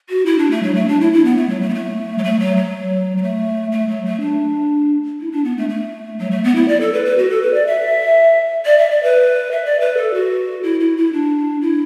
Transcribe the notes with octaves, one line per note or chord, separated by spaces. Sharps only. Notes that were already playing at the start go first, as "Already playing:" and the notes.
F#4
E4
D4
A3
F#3
A3
D4
E4
E4
B3
A3
F#3
A3
B3
A3
F#3
A3
F#3
F#3
F#3
A3
A3
F#3
A3
D4
E4
D4
B3
A3
A3
F#3
A3
B3
E4
D5
A4
B4
B4
F#4
A4
B4
D5
E5
D5
E5
D5
B4
E5
D5
B4
A4
F#4
E4
E4
E4
D4
E4